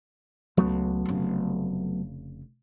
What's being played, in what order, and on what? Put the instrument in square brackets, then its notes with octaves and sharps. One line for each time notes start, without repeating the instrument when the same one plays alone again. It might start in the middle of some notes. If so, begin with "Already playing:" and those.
[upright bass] C#2 [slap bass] F#3 A3 B3
[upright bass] F1 C#3